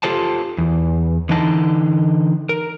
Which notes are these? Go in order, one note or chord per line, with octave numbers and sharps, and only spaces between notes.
F4 G4 A4 C5 A5
E2
D3 E3 D#4 D#5 A5
A#4